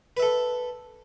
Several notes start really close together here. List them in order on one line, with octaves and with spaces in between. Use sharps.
B4 E5 A4